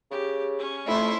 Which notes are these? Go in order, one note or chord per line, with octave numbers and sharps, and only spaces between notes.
C#3 G4
C#4
F2 A3 E4 C6